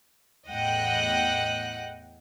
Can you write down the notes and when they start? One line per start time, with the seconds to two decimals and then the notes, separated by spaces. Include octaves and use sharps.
0.47 E2 A2 D#5 F#5 G5 F#6